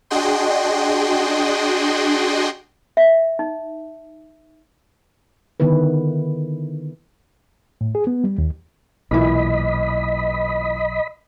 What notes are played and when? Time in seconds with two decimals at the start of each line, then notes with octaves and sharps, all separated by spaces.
0.10 D4 F#4 G#4 D#5 G5 C6
2.97 E5
3.39 D#4
5.60 D3 D#3 B3 E4 B4
7.81 A2
7.95 G#4
8.07 B3
8.24 G3
8.38 D#2
9.11 B1 A#2 E3 E4 D#5 B5